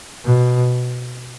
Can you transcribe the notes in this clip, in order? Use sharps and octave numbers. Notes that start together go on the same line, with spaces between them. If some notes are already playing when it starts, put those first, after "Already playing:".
B2